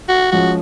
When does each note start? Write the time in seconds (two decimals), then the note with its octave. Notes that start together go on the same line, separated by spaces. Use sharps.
0.09 F#4
0.32 F3 G#3 C#4 F#4